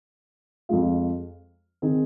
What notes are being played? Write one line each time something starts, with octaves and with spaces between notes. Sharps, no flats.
F2 F3 G#3 F4
D#3 C4 D#4 G#4